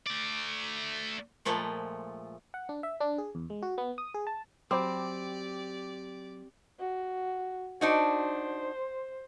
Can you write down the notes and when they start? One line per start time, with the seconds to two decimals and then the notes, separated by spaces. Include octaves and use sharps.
0.07 A3 D5
1.45 A#2 F3 G#3 A3
2.54 F#5
2.69 D4
2.83 E5
3.00 D4
3.18 G#4
3.35 E2
3.50 G#3
3.62 F#4
3.78 B3
3.98 D#6
4.14 G#4
4.27 A5
4.71 F#3 C4 G4 C5 D5 B5 D6
6.79 F#4
7.81 D4 D#4 F#4 C5